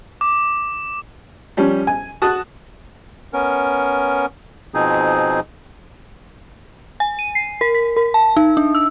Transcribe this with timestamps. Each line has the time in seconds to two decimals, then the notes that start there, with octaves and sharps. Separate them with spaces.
0.21 D6
1.57 F3 G3 C#4
1.87 G#5
2.22 F#4 A5 D#6 F#6
3.33 B3 C#4 A#4
4.74 B2 F3 C4 D#4 G#4
7.00 G#5
7.19 D#7
7.35 C7
7.61 A#4
7.74 B6
7.96 A#4
8.14 A5
8.36 D#4
8.57 D4
8.75 E6